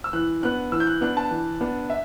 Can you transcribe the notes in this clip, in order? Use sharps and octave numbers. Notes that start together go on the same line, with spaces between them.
E6
E3 F#6
B3 D4 F#6
E3 E6
G6
F#6
B3 D4 F#6
A5
E3
B3 D4
E5